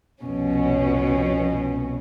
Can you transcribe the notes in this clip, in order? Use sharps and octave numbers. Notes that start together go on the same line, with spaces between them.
C2 F2 B2 C#4